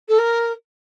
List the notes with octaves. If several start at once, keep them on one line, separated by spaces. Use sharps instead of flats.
A4
A#4